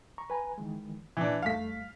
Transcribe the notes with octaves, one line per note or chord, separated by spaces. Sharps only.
A#5 C#6
B4 G#5 A#5
D#3 E3 G#3
A#2 E3 D4
F2 G3 A3 F5 B6